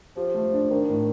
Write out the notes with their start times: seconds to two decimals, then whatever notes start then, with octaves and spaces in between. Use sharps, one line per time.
0.16 F3 G4
0.35 A3
0.53 D4
0.71 D#3 D4
0.89 A2